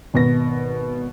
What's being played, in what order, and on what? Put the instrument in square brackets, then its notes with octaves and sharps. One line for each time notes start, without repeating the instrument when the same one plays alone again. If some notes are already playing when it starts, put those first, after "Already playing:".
[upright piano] G#1 B2 A#6